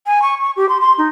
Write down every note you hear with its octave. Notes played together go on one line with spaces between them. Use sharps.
G#5
C#6
C#6
G4
C6
C6
D#4